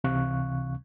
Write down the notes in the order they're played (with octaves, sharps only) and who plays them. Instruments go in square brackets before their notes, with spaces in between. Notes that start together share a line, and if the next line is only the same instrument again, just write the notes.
[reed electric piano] C#2 C3 E3 F5 C#6 F#6